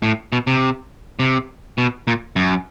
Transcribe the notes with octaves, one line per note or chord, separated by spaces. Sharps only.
A2
B2
C3
C3
B2
A#2
F#2